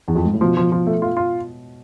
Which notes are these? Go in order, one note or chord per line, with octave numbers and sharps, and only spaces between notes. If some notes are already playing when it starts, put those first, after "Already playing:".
E2
F2
G#2
A2
B2 F3
F3
F3
A3
F4
F4